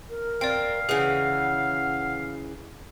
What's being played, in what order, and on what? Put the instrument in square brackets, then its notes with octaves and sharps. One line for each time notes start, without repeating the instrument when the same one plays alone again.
[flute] A#4
[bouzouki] C4 [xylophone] D5 G5 [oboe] F5
[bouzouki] C#3 E3 [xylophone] G#4 [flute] F#5